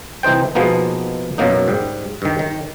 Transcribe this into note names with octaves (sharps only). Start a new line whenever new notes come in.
C2 E3 D#4 C5 G5
B2 F3 G#3 A#3 B3 D#4
F#2 B2 F#3 A#3 D#4
G#2 G3
G2 D#3
D#3